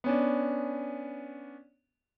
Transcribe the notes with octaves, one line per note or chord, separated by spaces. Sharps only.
B3 C#4 D4